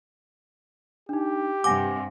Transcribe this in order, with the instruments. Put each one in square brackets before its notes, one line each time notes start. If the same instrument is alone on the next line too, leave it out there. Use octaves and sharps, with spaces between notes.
[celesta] D4 D#4 [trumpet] G4
[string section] G2 C3 [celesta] F#5 G#5 A#6 [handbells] D6